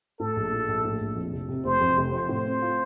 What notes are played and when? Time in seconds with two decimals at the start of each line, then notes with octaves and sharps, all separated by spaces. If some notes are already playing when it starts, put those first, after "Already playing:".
0.20 A2 A4
0.36 A#1
0.52 F3
0.68 A#1
0.84 A2
1.00 A#1
1.16 F2
1.32 F1
1.49 C3
1.64 F1 C5
1.81 F2
1.97 F1
2.13 F3 C5
2.29 A2
2.45 C4
2.62 F4